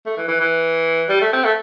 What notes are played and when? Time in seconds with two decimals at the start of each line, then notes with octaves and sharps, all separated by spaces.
0.06 A3
0.17 E3
0.28 E3
0.40 E3
1.09 G3
1.21 A3
1.33 C4
1.44 A3